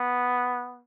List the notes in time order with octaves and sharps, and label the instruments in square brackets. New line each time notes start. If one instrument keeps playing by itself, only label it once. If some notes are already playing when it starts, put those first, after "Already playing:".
Already playing: [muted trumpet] B3